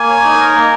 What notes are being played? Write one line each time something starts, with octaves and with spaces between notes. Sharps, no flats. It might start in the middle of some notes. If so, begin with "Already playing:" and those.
Already playing: A#3 G#5
C#5
D#4
A#4
A#3